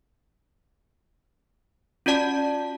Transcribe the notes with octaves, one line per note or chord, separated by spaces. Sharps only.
C#4 F4 F#4 D5 A5